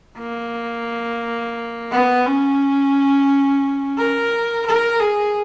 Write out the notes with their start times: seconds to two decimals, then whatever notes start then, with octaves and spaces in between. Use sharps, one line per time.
0.18 A#3
1.91 B3
2.26 C#4
3.97 A#4
4.66 A#4
5.00 G#4